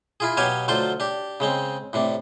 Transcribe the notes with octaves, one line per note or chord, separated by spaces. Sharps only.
E4 F4 G#4
B2 F#3 G4 C#5 F5 G#5
D2 F#3 F4 A4 C5 D6
D4 G4
C#3 G#3 C4
A2 C3 D4